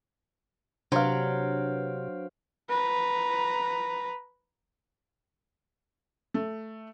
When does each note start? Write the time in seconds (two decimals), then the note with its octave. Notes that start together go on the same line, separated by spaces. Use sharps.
0.92 C3 F#3 D4 B4 C5 F5
2.69 B4 A#5
6.34 A3